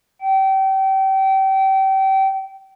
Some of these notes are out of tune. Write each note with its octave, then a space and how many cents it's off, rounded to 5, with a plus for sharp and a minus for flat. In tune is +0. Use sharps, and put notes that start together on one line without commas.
G5 -30